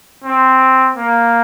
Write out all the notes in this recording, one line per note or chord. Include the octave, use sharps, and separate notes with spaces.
C4
A#3